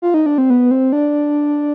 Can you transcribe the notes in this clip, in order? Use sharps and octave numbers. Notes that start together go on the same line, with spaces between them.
F4
D#4
D4
C4
B3
C4
D4